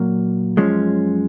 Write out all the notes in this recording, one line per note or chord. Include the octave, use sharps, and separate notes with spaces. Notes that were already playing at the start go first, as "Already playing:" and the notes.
Already playing: A#2 F#3 A#3
F#2 F3 G#3 C#4